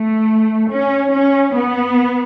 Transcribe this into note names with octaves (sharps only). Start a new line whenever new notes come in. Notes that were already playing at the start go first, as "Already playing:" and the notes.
Already playing: A3
C#4
C#4
B3